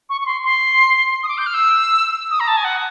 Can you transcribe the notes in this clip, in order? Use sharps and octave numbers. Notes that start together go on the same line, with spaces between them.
C#6
C#6
C6
C6
D#6
D6
G6
F6
E6
D#6
A#5
A5
G#5
F#5